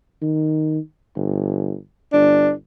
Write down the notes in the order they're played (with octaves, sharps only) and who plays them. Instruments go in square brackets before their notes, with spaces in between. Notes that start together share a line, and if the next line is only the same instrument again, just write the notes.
[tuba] D#3
G1
[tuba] G1 [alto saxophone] D4